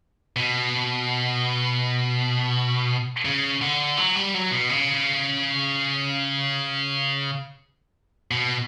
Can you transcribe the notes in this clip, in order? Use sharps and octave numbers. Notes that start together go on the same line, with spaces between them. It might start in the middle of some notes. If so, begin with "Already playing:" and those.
B2
C#3
D3
F#3
G3
F#3
B2
C#3
B2